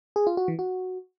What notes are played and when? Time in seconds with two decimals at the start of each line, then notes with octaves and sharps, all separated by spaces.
0.16 G#4
0.27 F4
0.37 F#4
0.48 E3
0.59 F#4